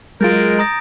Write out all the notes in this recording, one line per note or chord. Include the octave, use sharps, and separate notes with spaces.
F#3 G#3 F4 A#4 G6 A6 D7
A#5 D#6 A#6